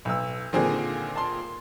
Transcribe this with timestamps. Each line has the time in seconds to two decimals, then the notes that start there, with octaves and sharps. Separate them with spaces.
0.05 B1 E6
0.53 A#2 D3 D#3 C4 G#4
1.16 A5 C6